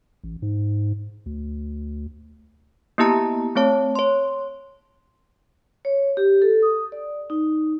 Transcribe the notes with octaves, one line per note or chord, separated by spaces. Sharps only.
A1
G#2
D2
A#3 B3 E4 G4 A5 A#5
A3 C4 C#5 A5
C#5 C6
C#5
G4
A4
D#6
D5
D#4